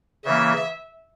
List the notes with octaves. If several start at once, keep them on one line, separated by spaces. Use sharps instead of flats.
C#3 E3 A#3 E5